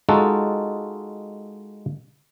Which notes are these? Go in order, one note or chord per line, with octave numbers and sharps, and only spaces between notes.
G#3 D#4 F4 F#4 A4